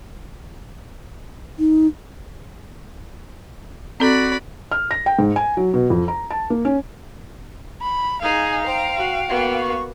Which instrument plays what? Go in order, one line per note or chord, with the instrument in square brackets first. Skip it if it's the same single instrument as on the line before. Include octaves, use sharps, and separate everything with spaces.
[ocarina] D#4
[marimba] C4 A4 [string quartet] F#4 D5 B5
[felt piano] F6
A#6
G5
G#2
G#5
F#3
B2
F2
A#5
A5
A#3
C#4
[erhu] B5
[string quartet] D#4 G#4 G#5 [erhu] F5
[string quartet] C5 A#5 [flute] G5
[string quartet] F#4
A#3 B3 F#4
[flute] C#6